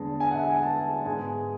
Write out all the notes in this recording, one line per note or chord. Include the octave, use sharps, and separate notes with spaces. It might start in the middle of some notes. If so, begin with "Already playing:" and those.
Already playing: E2 D3 G#3 B3 A5
G#5
F#5
E5
G#5
A5
G#2 G#3 B3 G#5